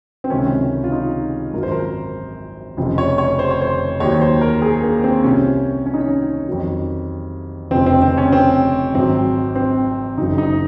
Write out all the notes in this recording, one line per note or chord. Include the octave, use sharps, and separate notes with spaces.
C4
C#2 C3 D#3 F#3 C#4
F4
D#4
G#1 F#2 F3 A#4
C5
A#4
F1 F2 C#3 F3
C#5
C#5
C5
C#5
C5
D#2 D#3 F#3 C#5
C5
A#4
G#4
A#3
C4
C2 C3 F3 C#4
C#4
D#4
C#4
F2 D#3 F#3
F1 F2 C#3 F3 C4
C4
C4
C#4
C4
G#1 G#2 F#3 C4
C4
F#1 F#2 C#3 D#4
D#4